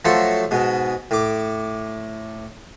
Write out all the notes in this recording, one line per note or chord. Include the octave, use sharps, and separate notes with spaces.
F3 F#3 A3 A4 C5
G#2 B2
A2 D6